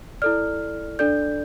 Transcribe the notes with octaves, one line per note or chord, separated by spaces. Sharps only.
E4 A4 D5 F6
D4 A4 D5 G6